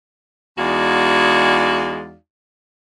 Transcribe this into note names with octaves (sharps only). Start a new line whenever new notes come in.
E2 G#3 D#4 F#4 D5 F5